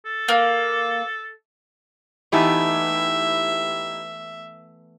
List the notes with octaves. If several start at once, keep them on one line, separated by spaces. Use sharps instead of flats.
A4
A#3
E3 A3 B3 D#4 E4 G4 E5